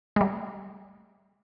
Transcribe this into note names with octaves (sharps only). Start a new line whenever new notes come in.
G#3
G3 A3